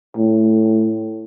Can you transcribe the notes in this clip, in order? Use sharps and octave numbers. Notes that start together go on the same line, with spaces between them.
A2